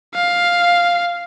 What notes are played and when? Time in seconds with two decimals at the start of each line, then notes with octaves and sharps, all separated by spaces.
0.15 F5